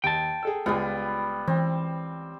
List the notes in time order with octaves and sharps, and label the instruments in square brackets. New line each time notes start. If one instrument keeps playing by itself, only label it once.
[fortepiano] D#2 [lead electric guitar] G5 A5
[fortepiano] G#4 A4 E6
[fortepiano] C#2 F4 G#4 [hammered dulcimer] G3 B3
[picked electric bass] E3 [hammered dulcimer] C4